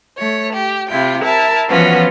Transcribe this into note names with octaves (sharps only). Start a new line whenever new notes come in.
A3 C#5
G4
C3 E4 F4 G5
E4 A#4 E5 A5
E3 F3 B3 C#4 F4 F#4